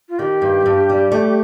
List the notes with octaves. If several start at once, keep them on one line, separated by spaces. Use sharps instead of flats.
F4
D#3 G4
G2
G2
G3
A3